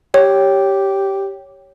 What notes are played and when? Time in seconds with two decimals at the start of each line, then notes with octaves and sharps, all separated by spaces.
0.14 G4 C#5